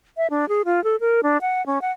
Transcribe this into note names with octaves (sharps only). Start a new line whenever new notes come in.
E5
D4
G#4
F4
A4
A#4
D4
F#5
C#4
F#5